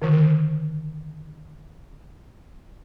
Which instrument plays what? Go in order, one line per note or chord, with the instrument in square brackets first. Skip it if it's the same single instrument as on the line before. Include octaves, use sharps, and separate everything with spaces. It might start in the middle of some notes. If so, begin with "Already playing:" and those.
[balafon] D3 D#3